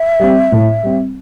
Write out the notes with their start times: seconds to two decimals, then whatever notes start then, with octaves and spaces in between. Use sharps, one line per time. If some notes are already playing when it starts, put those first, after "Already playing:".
Already playing: E5
0.20 G3 C4
0.52 A2
0.83 G3 C4